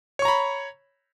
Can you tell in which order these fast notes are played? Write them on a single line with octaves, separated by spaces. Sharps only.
C#5 C#6 A#5 B5